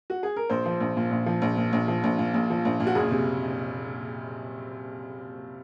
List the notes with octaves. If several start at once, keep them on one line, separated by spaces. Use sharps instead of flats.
F#4
G#4
A#4
A#1 C5
F3
A#1
A#2
A#1
F3
A#1
A#2
A#1
F3
A#1
A#2
A#1
F3
A#1
A#2
F#4
F#1 G#4
C3